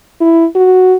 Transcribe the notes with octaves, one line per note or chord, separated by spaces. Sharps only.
E4
F#4